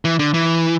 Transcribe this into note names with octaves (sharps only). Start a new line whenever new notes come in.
E3
D3
E3